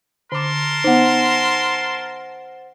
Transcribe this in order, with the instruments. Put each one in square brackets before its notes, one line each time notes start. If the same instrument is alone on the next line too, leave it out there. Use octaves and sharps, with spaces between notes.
[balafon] D3 D6 [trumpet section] A#4 A5 C6
[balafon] B3 D#4 [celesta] C5 F#5